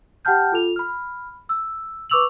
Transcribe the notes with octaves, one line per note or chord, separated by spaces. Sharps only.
G4 F#5 G5 A5 F6 G6
F4 A4 F7
B5 F6
E6
B4 C#6 D6 E6 F7 F#7